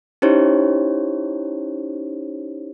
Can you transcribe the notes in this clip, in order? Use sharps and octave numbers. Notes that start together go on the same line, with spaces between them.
C#4 D#4 E4 G4 C5 C#5